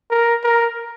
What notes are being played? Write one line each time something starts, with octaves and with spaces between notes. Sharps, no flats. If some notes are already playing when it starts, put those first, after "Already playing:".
A#4
A#4